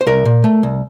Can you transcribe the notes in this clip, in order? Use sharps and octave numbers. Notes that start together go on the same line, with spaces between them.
C5
C2 A#4
A#2
A3
C2